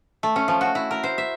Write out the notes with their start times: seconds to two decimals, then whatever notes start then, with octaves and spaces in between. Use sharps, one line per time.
0.23 A3
0.36 C#4
0.48 F3
0.61 F#4
0.75 E4
0.91 A#4
1.03 C5
1.18 E5